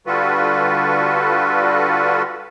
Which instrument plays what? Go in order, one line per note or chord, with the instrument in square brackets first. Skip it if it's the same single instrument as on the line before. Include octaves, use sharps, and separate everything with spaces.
[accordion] D3 G3 F4 F#4 A4 B4